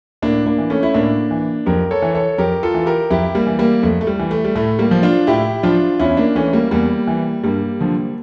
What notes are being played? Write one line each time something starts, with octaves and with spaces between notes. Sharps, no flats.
A2 A#3 D4
A#3 D4
E3
A3 C#4
E4
A2 A#3 D4
E3
F2 G4 A#4
A4 C#5
E3
A4 C#5
F2 G4 A#4
F4 A4
E3
G4 A#4
F2 E4 G4
G3 A#3
E3
G3 A#3
F2 A3
A3
G3
E3
A3
G3
A2 A3
G3 A#3
F3
D4 F4
A2 E4 G4
F3 D4 F4
E2 C#4 E4
A#3 D4
E3 A3 C#4
G3 A#3
E2 G3 A#3
E3
G2 G3 A#3
D3 F3